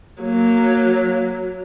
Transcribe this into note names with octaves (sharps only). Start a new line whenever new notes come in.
F#3 A#3